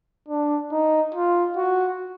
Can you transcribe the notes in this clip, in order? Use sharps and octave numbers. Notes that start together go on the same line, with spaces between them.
D4
D#4
F4
F#4